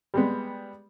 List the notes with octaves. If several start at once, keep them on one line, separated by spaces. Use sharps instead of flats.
G3 G#3 B3